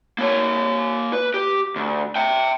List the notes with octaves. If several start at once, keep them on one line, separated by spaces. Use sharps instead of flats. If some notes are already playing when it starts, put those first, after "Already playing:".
A#3 C#5
B4
G4
D2
E5 G5